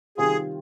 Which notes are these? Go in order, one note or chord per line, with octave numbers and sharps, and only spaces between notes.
C3 D#3 G3 C4 F4 G#4